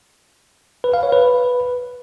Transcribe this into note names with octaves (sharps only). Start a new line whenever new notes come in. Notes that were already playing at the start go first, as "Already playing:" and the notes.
B4
F5
C#5
B4